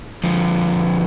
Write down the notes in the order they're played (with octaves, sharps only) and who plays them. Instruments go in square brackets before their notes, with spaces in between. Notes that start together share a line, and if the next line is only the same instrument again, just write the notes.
[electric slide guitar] D3 F3